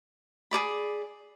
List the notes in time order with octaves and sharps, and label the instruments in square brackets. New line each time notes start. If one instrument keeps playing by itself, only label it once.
[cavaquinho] G#4 A4 D5 B5